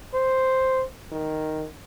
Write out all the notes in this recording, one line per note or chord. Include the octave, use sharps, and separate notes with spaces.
C5
D#3